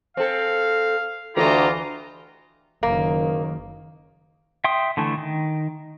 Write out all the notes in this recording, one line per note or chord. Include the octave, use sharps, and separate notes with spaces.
C4 A4 F5
D2 E3 F4 G4 D#5 A#5
F#1 D#3 A#3
E5 G5 C6 D#6
D3 E3 A3
D#3